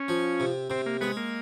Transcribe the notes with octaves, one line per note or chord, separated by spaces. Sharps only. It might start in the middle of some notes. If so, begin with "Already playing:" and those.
Already playing: C#4
F3
C3
C3 C4
A#3
G#3 B3
A#3